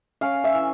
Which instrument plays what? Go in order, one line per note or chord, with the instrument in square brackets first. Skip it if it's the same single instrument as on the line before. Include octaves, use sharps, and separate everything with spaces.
[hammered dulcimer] C#4 F5
E5
E3